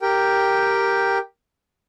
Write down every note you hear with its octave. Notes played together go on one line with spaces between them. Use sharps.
G4 A#4 G5